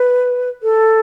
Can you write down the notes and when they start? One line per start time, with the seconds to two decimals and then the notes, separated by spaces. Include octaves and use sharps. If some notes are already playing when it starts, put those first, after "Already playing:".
Already playing: B4
0.63 A4